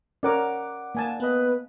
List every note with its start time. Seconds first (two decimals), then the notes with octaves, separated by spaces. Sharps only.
0.23 C#4 A#4 C#5 D5 F#5 D6
0.95 A#3 G#5 A5
1.20 B3 B4 D#5